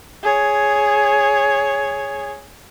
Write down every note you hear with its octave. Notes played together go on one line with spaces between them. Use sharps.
G#4 C#5